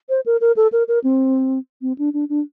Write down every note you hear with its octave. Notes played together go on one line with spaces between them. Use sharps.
C5
A#4
A#4
A4
A#4
A#4
C4
C4
D4
D4
D4